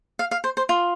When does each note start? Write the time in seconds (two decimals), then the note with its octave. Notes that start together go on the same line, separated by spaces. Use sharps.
0.19 F5
0.31 F5
0.44 C5
0.57 C5
0.69 F4